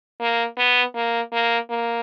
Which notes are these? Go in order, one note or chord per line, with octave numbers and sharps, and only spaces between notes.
A#3
B3
A#3
A#3
A#3